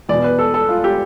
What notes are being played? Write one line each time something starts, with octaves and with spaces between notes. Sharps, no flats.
E2 B2 D5
B4
A4
A4
F4
G4